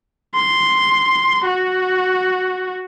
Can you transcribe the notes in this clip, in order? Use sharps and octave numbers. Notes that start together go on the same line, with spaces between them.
C6
F#4